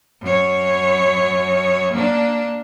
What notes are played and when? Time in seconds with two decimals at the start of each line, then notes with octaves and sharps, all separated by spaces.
0.21 F#2 C#5
1.92 A#3 D4